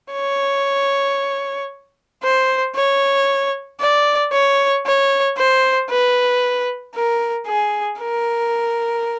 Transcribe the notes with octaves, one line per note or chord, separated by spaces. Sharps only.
C#5
C5
C#5
D5
C#5
C#5
C5
B4
A#4
G#4
A#4